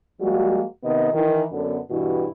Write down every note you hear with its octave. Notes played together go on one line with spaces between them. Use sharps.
F3 G3 G#3 A#3 F#4
C3 D#3 B3 D#5
D#3 E3
F#2 D3 B3
G2 B2 E3 E4 F#4 G4